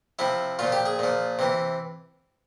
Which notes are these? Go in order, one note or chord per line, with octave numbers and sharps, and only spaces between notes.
C3 F3 E4
A#2 F3 F4
G4
G#4
A#2 F3
C3 E3